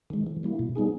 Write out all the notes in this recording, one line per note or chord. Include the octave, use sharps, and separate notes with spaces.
D#3 G#3
E3
G3 A#3 E4
B2
G3 B3 D#4 G#4